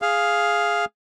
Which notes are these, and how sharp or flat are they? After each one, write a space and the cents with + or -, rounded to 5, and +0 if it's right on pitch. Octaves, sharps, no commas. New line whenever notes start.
G#4 +0 F5 +0